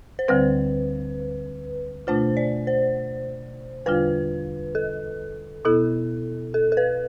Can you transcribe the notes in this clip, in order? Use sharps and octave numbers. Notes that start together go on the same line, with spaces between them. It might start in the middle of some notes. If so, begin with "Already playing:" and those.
C5
D2 D3 G3 C4 B4
B2 A3 D4 F4 C5
D5
C5
E2 D3 G3 D4 F4 B4
A4
B2 B3 E4 A4
A4
A4
B4